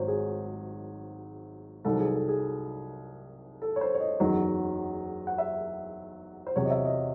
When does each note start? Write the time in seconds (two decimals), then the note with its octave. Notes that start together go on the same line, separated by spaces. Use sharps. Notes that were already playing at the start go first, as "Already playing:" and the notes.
Already playing: G#1 G#2 F#3 C5 C#5
0.08 G#4
1.85 C2 C3 D#3 F#3 A4
2.00 G#4
2.14 A4
2.29 G#4
3.62 A4
3.76 C#5
3.81 C5
3.94 C#5
4.00 D#5
4.20 F#1 E2 D#3 F#3
5.27 F#5
5.38 E5
6.47 C5
6.56 E2 C3 F#3 C#5
6.66 D#5
6.70 E5
6.85 D#5